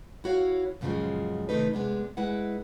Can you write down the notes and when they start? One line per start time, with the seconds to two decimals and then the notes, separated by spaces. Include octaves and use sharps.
0.24 E4 F#4 C#5 F5
0.81 F#2 A#2 C#3 E3 F3 G#3
1.49 C3 D#3 E3 A3 D#4 B4
1.74 C3 G#3 B3 D4
2.17 G#3 E4 B4 F#5